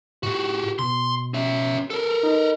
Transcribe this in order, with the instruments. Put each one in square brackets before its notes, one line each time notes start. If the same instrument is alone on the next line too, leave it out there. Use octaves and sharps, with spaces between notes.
[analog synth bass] A2 [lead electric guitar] F#4 G4
[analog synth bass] B2 [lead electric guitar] C6
[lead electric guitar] C#4 E5
A4 A#4
[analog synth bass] D#4